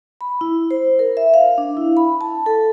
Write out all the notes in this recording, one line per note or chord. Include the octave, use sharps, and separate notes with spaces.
B5
E4
C5
A#4
E5
F5
D4
E4
B5
A5
A4